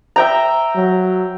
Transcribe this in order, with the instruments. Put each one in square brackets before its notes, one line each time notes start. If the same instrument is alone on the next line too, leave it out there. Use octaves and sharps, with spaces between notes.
[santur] E5 G5 A#5
[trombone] F#3